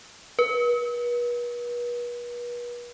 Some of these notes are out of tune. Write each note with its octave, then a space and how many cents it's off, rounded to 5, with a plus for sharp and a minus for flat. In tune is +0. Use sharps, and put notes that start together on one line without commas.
B4 -40